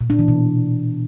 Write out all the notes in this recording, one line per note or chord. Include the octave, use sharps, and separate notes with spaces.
A#2
D4
E3
B2